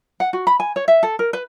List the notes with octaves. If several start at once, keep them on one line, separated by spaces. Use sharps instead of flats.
F#5
F#4
B5
G#5
C#5
E5
A4
A#4
B4